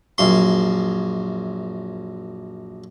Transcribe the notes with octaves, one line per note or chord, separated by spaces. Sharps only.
A#1 F#2 C6